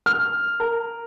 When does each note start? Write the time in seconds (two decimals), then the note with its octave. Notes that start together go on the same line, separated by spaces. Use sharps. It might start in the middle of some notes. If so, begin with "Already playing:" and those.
0.06 F6
0.60 A#4